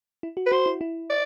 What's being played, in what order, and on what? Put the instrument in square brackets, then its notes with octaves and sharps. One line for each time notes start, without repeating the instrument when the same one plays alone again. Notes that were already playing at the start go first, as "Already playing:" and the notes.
[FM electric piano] E4
F#4
[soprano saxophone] B4
[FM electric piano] F#4 [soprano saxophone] C5
[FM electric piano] E4
E4
[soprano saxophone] D5